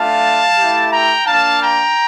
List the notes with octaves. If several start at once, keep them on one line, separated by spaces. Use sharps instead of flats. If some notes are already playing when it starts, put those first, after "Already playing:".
Already playing: A3 D4 F4 F5 A5
A3 E4 G4
G5 A#5
A#3 D4 F4 F5 A5
G5 A#5